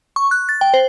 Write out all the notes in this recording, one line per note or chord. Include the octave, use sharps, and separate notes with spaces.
C#6
F#6
A6
G5
C5